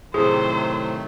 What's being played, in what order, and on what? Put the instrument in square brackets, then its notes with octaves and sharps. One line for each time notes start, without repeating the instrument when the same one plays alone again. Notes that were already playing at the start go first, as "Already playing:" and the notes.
[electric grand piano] A2 C3 [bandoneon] D#3 F#3 A3 [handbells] G#4 [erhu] C5